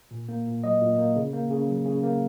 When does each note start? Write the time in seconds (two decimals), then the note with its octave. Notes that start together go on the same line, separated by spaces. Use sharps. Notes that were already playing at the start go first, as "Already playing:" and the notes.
0.11 A#2
0.29 A#3
0.46 A#2
0.64 F#3 D#5
0.81 A#2
0.98 A#3
1.16 C#3
1.33 A#3
1.51 C#3
1.68 F#3
1.85 C#3
2.03 A#3